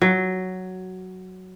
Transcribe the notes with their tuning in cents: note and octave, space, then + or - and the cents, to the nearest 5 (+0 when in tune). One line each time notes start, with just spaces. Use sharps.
F#3 +5